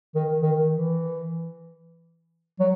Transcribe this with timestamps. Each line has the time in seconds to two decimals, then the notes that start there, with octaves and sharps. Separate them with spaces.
0.15 D#3
0.42 D#3
0.70 E3
2.60 F#3